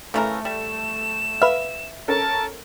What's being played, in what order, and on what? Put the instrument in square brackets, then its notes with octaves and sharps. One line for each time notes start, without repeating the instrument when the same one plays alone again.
[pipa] C#3 E3 A#4 [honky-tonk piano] A3
[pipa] G3 [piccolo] E7
[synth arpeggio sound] B4 F5 [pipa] E5
[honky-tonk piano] C#4 A4 A#4 [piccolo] A5